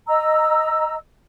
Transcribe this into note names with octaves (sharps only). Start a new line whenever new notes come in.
D#5 A#5 E6